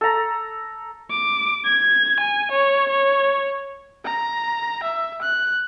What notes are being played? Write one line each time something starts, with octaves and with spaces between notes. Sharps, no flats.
A4 A#5
D6
G#6
G#5
C#5
C#5
A#5
E5
F#6